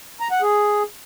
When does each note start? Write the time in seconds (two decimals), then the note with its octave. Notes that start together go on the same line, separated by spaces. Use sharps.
0.20 A#5
0.31 F#5
0.42 G#4